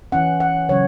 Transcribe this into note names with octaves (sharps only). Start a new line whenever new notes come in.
E3 C#4 F#5
F#5
C#3 F#3 C#4 C#5